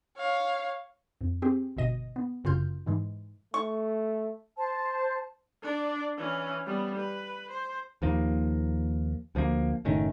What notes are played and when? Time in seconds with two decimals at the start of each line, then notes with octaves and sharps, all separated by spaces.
0.18 C#5 F5
1.21 F2
1.42 C4 G4 G#4
1.77 G1 B2 D#5 D#7
2.16 B3
2.44 G1 F#2 C#3 F4 F6 G6
2.86 G#2 E3 G#3
3.54 A3 C#6
4.57 C5 A5
5.62 D4 D5
6.17 E3 C#4
6.66 G3 B3
6.96 B4
7.51 C5
8.02 D#2 F3 A#3
9.35 D2 F3 A3 A#3
9.85 F#1 A2 D#3 C#4